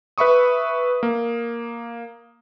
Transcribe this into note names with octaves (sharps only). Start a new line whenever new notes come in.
B4 E5 B5 C#6 D#6
A#3